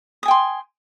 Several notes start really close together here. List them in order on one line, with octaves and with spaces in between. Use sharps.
D#6 G#5 G5 C6